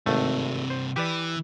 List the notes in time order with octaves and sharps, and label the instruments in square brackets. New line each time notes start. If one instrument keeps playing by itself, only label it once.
[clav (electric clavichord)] G#1 A3 [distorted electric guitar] G2 C3
[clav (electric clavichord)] C5
[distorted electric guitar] E3 [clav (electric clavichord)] G4 B4 D5